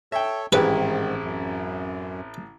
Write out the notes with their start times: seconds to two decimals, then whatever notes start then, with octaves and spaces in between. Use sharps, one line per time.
0.12 A4 C#5 E5 G5
0.53 A1 G#2 D#3 C4 E4 G4 G#4 B4
1.24 F#2